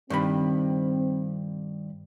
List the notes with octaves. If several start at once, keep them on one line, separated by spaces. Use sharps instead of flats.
G2 D#3 C4 B5